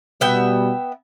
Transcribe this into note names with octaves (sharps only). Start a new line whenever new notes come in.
B2 G3 B3 E5 G5